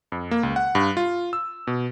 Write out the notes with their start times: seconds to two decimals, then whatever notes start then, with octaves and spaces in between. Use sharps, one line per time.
0.12 F2
0.31 A#3
0.43 C#2
0.56 F#5
0.75 G2
0.97 F4
1.33 E6
1.67 B2